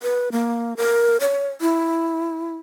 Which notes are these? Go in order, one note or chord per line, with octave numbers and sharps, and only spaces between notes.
B4
A#3
A#4
C#5
E4